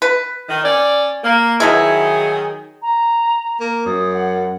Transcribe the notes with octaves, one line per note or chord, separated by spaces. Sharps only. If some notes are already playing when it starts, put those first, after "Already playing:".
B4
D#3
C#4 D5
A#3
B2 D#3 F#3 D#4 E4 G#4
A#5
A#3
F#2 D#6
F#5